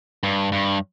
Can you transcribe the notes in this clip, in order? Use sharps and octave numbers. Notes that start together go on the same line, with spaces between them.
G2
G2